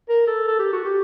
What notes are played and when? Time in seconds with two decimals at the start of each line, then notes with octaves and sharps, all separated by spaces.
0.09 A#4
0.27 A4
0.47 A4
0.59 G4
0.73 F#4
0.85 G4